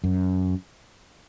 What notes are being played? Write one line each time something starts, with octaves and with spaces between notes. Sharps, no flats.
F#2